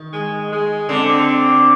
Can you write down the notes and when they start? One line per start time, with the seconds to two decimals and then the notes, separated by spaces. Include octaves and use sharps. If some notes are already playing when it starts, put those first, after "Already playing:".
Already playing: D#3
0.13 G#3
0.51 G#3
0.89 D3 C4